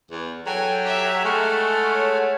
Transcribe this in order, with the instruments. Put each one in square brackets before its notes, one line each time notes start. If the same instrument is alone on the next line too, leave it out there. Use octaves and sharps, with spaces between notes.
[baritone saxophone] E2
[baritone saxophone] F#3 [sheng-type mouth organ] A4 [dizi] G5 [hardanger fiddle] G#5
[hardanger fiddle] G4 E5
[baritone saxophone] G#3 [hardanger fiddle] A3 [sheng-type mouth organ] A4 F#5 F6 [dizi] C#6
[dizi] C#5